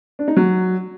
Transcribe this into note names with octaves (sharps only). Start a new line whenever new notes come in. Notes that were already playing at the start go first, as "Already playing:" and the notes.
D4
D#4
F#3